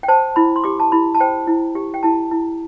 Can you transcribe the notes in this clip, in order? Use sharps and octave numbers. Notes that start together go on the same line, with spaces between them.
G5
C5 A5
E4 B5
C6
G4 D6
A5
E4 B5
A5
C5 G5
E4
G4
G5
E4 A5
E4